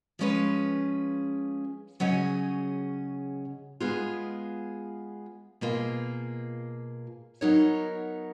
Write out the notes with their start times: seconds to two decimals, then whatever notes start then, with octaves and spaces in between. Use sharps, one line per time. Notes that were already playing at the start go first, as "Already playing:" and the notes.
0.19 F3 G#3 C#4 G#4 B4
2.00 C#3 F#3 C#4 G#4 D#5
3.80 G#3 B3 F4 G#4
5.61 B2 A#3 F4 G#4
7.41 F#3 B3 D#4 A#4 C#5